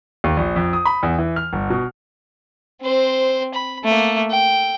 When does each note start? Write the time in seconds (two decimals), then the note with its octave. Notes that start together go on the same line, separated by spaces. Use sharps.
0.24 D#2
0.37 A#1
0.56 F2
0.73 D#6
0.85 B5
1.03 E2
1.18 E3
1.36 F6
1.53 G1
1.70 B2
2.82 C4 C5
3.54 B5
3.84 A3 A#3
4.30 G5